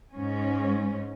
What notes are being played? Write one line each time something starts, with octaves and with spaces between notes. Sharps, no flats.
G#2 C#4